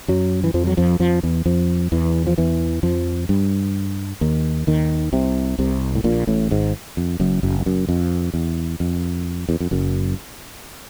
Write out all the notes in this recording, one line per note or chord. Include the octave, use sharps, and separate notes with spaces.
F#2 F#3
E3
F2 F3
F#3
F2 F3
F2 F3
E2 E3
F2 F3
E2 E3
F3
E2 E3
F2 F3
G2 G3
D#2 D#3
D#2 D#3
C2 C3
C2 C3
A2
A#1 A#2
A1 A2
G#1 G#2
F2
F#1 F#2
F#1 F#2
F2
F#1 F#2
F2
E2
F2
E2
F2
F#1 F#2